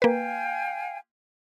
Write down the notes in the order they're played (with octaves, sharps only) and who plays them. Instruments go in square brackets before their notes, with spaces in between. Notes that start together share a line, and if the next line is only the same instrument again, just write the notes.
[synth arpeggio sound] A#3 B4 [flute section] F5 G5 G#5